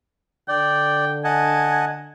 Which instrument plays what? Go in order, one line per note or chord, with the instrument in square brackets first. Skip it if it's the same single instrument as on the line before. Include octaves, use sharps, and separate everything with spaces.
[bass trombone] D3 [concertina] D5 [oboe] G5
[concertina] D#5 F#5 A5 [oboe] G#5